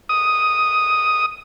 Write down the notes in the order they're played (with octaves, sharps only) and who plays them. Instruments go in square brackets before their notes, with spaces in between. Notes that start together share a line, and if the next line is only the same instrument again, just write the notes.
[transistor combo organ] D#6